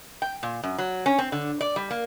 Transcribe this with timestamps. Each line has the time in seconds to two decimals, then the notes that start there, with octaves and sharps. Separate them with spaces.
0.22 G5
0.43 A#2
0.63 F#2
0.78 F#3
1.06 C#4
1.19 C4
1.32 D3
1.61 D5
1.76 G3
1.91 A#3